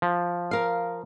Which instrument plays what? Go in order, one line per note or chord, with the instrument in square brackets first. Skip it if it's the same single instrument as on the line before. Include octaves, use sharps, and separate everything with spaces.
[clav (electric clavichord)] F3
[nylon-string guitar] A#4 F5